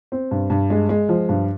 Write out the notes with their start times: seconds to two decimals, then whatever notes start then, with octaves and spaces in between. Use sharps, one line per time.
0.12 C4
0.31 G2
0.50 G2
0.70 G#3
0.89 G#3
1.09 F3
1.29 G2